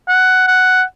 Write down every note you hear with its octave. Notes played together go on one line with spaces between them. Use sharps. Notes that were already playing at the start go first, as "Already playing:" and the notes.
F#5
F#5